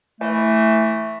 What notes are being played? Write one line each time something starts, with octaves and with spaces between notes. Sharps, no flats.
E3 A3